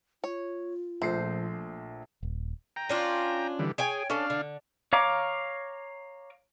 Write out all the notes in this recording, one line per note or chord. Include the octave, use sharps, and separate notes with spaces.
F4 C#5
A#1 A#2 F3 A3 C5 C7
D#1
G5 A#5
C#4 D4 F4
D3 E3 G3
G#4 C#5 G5 G#5
C#4 D4 A4 F5
D3
C#5 F5 A#5 D6